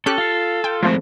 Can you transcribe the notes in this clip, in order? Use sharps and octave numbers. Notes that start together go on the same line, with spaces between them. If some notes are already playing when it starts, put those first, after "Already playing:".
C#4 G4 A4 F#6
F4 F5
F4 G5
F3 G#3 A3 C4